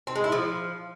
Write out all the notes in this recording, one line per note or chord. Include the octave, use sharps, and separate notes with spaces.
C4
G#3
E4
F3